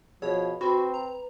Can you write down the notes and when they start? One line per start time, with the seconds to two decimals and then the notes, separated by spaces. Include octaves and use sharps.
0.22 B2 F3 G#4 C#5
0.61 C4 F#4 B4 B5
0.94 A#5